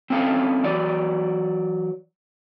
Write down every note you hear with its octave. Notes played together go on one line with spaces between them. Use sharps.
C4 C#4 E4 A4 F5
E3 F#3 D5